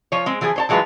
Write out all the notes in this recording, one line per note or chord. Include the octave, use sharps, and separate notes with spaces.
F3 C#5
G#3 C4
E3 F3 E4 G#4
C5 C#5 A5
E3 F#3 G#3 F4 B4